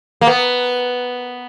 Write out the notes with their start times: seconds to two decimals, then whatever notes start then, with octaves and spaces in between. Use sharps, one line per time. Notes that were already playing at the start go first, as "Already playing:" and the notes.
0.21 A#3
0.27 B3